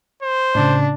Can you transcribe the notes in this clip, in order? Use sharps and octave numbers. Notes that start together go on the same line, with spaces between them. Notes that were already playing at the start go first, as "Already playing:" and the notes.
C5
A2 C#3 D4